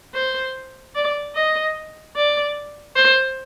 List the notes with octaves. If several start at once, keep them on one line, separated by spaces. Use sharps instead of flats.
C5
D5
D#5
D5
C5